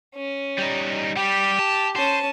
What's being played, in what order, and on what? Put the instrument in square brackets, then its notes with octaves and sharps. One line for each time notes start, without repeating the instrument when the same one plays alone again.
[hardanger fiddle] C#4
[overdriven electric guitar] G3 D#4
[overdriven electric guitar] G3 [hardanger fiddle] G4
[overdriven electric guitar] A5
[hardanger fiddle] C#4 A5 [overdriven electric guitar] C5